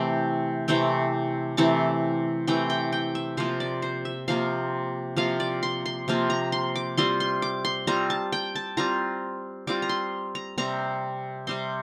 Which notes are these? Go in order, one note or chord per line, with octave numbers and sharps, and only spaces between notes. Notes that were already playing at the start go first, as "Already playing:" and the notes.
Already playing: C3 E3 A3 C4 G5
C3 E3 A3 C4 G5
C3 E3 A3 C4 A5
C3 E3 A3 C4 G5
G5
G5
E5
C3 F3 A#3 F4 C5
D5
C5
E5
C3 F3 A#3 F4 F5
C3 F3 A#3 F4 F5
D5
C6
C6
C3 F3 A#3 F4
A#5
C6
D6
G3 C4 F4 C6
C6
D6
C6
G3 C4 F4 A#5
A5
G5
A5
G3 C4 F4 A#5
G3 C4 F4 D6
A#5
C6
A#5
C3 G3 C4 A#5
C3 G3 C4 C6